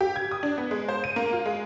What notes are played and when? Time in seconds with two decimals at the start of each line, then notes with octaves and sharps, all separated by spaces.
0.01 G4
0.16 G#6
0.31 D#6
0.43 D4
0.58 B3
0.71 G#3
0.89 C5
1.04 D#7
1.16 A#3
1.33 F4
1.46 G#3